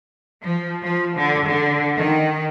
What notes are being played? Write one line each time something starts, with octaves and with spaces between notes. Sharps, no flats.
F3
F3
D3
D3
D#3